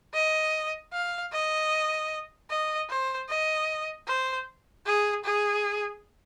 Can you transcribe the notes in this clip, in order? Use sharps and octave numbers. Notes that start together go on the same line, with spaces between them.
D#5
F5
D#5
D#5
C5
D#5
C5
G#4
G#4